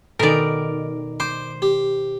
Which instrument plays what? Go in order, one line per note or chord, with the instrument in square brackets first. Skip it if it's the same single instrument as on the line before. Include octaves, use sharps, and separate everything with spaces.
[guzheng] B2 D#3 [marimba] A4 [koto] A#4 D5
[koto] C5 [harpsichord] D6
[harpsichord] G4